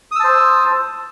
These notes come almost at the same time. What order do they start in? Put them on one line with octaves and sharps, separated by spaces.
D#6 E6 A5 C5